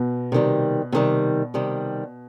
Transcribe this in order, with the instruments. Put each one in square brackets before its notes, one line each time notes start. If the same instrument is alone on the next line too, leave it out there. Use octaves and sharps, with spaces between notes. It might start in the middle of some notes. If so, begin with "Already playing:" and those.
Already playing: [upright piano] B2
[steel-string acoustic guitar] C3 D#3 G3
C3 D#3 G3
C3 D#3 G3